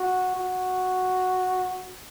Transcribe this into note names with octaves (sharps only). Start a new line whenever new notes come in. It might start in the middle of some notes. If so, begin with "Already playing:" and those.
Already playing: F#4
F#4